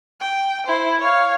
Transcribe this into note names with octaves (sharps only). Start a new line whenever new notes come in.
G5
E4 C5
C#5 F5